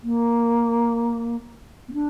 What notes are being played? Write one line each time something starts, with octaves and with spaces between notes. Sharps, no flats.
A#3
B3
D4